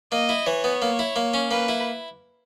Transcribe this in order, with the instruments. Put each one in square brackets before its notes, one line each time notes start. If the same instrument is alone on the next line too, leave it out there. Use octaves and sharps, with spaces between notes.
[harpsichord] A#3 [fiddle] D#5
[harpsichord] E4
[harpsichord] E3 [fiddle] C#5
[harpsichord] B3
A#3
E4
A#3
C#4
[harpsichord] A#3 [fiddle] B4
[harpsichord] E4